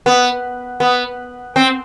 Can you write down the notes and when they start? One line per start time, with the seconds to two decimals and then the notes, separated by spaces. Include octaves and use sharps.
0.06 B3
0.80 B3
1.56 C4